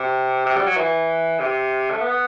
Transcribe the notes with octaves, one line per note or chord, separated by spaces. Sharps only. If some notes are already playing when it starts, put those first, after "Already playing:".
Already playing: C3
C3
G3
F#3
E3
C3
A3
B3